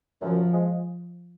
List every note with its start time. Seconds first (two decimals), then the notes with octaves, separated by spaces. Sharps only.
0.22 F#2 F3
0.54 F3 G#3